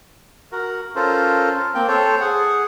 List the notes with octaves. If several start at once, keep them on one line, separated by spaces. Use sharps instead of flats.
F#4 A#4
C#4 F4 A4 A#4 C5
A#3 C4 G5
A4 C5 C#5
G#4 F#5